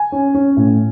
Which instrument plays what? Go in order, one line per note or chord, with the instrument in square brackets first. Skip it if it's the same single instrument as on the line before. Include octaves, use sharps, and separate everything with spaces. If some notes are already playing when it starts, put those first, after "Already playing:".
Already playing: [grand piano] G#5
C#4
C#4
A2